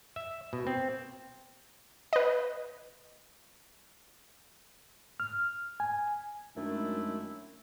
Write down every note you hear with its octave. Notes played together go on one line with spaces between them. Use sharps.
E5
B2
C4
B4 D#5
F6
G#5
F#2 D#3 G#3 A3 D4 E4